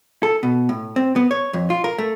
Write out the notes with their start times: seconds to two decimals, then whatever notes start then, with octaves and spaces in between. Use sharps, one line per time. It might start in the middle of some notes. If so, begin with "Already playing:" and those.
0.23 A4
0.43 B2
0.69 A2
0.96 C4
1.16 B3
1.31 C#5
1.53 F2
1.70 F4
1.84 A#4
1.98 A3